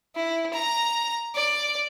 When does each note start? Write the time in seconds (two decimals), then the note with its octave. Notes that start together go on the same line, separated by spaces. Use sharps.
0.16 E4
0.53 A#5
1.35 D5